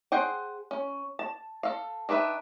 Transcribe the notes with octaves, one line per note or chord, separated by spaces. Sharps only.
G#4 C5 F#5 G5
C#4
A5
A4 F5
D#3 D4 B4 E5